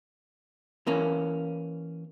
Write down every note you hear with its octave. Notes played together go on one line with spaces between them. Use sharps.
E3 A#3 C#4